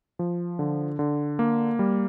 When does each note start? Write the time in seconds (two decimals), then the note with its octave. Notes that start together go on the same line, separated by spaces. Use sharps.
0.19 F3
0.59 D3
0.99 D3
1.39 A#3
1.79 G3